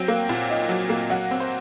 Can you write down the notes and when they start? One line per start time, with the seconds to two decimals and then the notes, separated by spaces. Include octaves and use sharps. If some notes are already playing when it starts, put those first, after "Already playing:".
Already playing: F#3 C4 G5
0.08 A#3
0.29 A#2
0.50 D#4
0.69 F#3
0.89 A#3
1.10 F#3 F#5
1.31 C4
1.40 C5